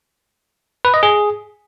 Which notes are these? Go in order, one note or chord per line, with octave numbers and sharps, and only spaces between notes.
B4
D#5
G#4